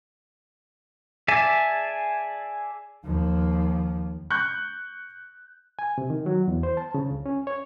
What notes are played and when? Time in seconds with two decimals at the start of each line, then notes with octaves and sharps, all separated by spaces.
1.28 G#4 D5 E5 G#5 A5
3.05 D#2 F3
4.30 C#6 F#6 G6
5.79 G#5
5.98 C3
6.10 D#3
6.26 F#3
6.48 E2
6.63 C5
6.77 A5
6.94 C#3
7.11 C#2
7.26 C#4
7.47 C#5